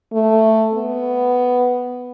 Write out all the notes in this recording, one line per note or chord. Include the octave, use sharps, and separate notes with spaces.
A3
B3